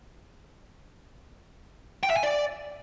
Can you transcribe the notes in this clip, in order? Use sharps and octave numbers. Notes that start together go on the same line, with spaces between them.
G5
E5
G#5
D5